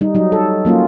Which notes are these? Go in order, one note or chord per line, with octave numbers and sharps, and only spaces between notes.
G3 D#4
F#3 D#4
A4
F#3 A#3 C#4 F4